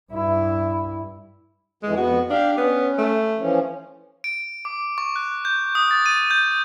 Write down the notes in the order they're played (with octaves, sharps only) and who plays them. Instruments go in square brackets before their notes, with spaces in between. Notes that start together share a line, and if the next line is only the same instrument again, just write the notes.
[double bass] G2 E4
[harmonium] F2 D3 E3 [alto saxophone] G#3
[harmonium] F2 B3 [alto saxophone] F#4
[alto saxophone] D4 [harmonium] G4 F5
[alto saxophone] B3 [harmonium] C#4
[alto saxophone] A3
[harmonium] E3 F3 C#4
[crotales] D7
D6
C#6
F#6
G6
D#6
A6
D#7
G6